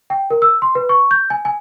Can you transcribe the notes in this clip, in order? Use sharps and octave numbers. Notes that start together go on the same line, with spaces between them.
G5
A#4
E6
C6
B4
C#6
G6
G#5
G#5